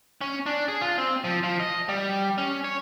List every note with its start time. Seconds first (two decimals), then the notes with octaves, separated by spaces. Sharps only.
0.21 C#4
0.46 D4
0.68 G#4
0.82 F4
0.98 C4
1.24 F3
1.43 F3
1.60 D#5
1.89 G3
2.38 C#4
2.64 C#5